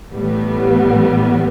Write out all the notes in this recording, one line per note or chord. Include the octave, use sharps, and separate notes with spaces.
A1 A2 G3 B3